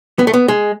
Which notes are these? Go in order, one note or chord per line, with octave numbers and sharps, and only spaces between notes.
B3
A3
B3
G#3